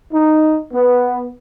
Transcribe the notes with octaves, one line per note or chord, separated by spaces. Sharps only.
D#4
B3